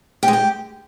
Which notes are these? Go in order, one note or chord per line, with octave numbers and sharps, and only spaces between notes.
G4
G#3
G4